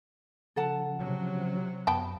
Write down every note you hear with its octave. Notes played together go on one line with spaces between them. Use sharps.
C#3 F3 A4 F#5 A5
C3 F#3
F#2 B3 G5 A5 B5